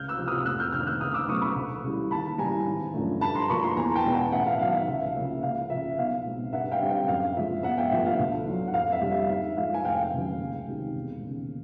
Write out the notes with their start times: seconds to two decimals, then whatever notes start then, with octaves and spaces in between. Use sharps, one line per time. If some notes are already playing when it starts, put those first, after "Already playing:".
Already playing: C#2 F6 G6
0.08 E6 F#6
0.18 C3 F3
0.28 D#6 F6
0.45 F1 E6 F#6
0.59 F6 G6
0.72 D#2 D3 F6 G6
0.87 E6 F#6
1.01 C#2 D#6 F6
1.14 D6 E6
1.28 B2 F#3 A3 C#4 C#6 D#6
1.42 B5 C#6
1.55 D2
1.83 C#3 E3 G3
2.11 D#2 A5 B5
2.38 C#3 E3 G3 G#5 A#5
2.67 G#1
2.94 F#2 D3 F3 A3
3.21 G2 A5 B5
3.35 A#5 C6
3.49 D3 F3 A#3 B5 C#6
3.63 A#5 C6
3.77 E2 G#5 A#5
3.95 G5 A5
4.04 B2 G#3 B3 D4
4.14 F#5 G#5
4.32 A1 E5 F#5
4.47 F5
4.59 G#2 D#3 F#3 B3 F5
4.74 E5
4.87 C#2 F5
5.15 C#3 F3 A#3 C#4 E5
5.43 C#2 F5
5.70 C#3 F3 E5
5.98 B1 F5
6.25 B2 G#3 C4
6.53 G2 E5 F#5
6.71 F5 G5
6.81 D3 G3 C4
6.89 F5 G5
7.08 F#2 F5
7.36 C#3 F3 G#3 E5
7.63 G1 E5 F#5
7.77 F5 G5
7.91 G2 D3 F3 A3 E5
8.06 F5
8.19 D2
8.46 D3 F#3
8.67 F#5
8.74 F2 F5
8.92 E5
9.01 D3 G3
9.11 F5
9.29 G#2 E5
9.57 F3 G#3 F5
9.74 G#5
9.85 F1 F5 G5
10.12 D#2 C#3 F#3
10.40 C#2
10.67 C3 D#3 G#3
10.95 E1
11.22 D#2 C#3